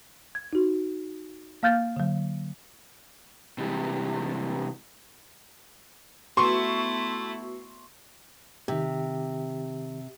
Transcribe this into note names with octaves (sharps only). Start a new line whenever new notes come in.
G#6
D#4 F#4
A#3 F5 F6 G6 A6
D3 F#3
C3 E3 G3 G#3
A3 B3 E4 F#4 C6 C#6
C3 D#3 G4